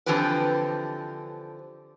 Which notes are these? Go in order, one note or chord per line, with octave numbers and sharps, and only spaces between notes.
D3 E3 F3 C4 G4 B4